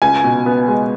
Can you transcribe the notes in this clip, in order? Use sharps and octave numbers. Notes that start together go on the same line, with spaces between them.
C#2 G#5
B2
B3
G#3